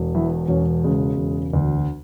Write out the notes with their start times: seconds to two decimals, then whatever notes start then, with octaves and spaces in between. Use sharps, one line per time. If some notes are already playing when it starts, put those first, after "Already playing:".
Already playing: E1
0.15 E2 E4
0.48 E1 C#4
0.84 C#3 G#3
1.18 E1
1.53 D2